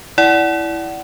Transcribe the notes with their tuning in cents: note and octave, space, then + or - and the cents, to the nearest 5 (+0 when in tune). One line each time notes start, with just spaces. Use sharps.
E4 +0 D5 -15 F#5 +25